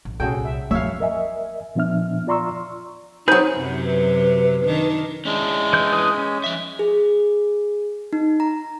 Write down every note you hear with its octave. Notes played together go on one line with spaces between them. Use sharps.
A1
C2 A#2 C#4 F#4 G#4 A4 G5
E5
F#2 F3 B3 C#5 E5 F5
A#4 D#5 E5 G#5
A#2 F3 B3 D4 E5 F6
F4 D5 A#5 C6 C#6 E6
F#3 C4 D#4 G#4 B4 G6
F#2 C3 F#3
B4
D#3 D4
G#3 C#4 D4 E4
E3 G6
B4 G#5 D#6
C#4
F3 E5
G#4
D#4
A#5